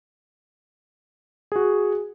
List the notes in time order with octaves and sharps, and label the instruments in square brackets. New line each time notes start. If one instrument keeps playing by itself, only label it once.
[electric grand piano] F#4 G#4